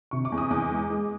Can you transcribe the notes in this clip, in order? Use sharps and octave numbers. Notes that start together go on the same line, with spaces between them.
C3 C#6
D6
E2
D#6
E2 D6
G#3
G#3